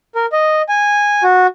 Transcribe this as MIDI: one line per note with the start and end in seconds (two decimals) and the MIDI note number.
0.15 0.26 70
0.32 0.62 75
0.69 1.23 80
1.23 1.47 66